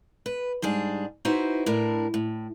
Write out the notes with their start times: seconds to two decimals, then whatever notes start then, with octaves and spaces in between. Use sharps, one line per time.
0.26 B4
0.62 G#2 G3 D4 G#4
1.25 D#4 E4 F#4 B4 C5 E5
1.66 A2 D4 E4 A#4
2.14 A2